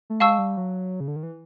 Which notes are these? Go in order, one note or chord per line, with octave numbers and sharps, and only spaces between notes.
A3
G#3 F5 A5 C#6 E6
G3
F#3
C#3
D3
D#3
E3